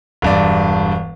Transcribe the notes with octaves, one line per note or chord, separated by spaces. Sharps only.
E1 G2 D5